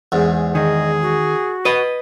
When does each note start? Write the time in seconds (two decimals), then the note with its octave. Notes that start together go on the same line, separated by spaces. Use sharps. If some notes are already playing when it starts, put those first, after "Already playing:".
0.12 E2 G#2 G#4
0.55 D#3 G#4 D#5
1.02 F#4
1.65 B4 D#5 D#6